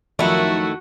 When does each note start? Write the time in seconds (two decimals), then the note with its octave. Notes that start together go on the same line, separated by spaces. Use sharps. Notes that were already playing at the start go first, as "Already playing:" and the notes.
0.19 F#2 D#3 F3 A3 D#4 E4 F#4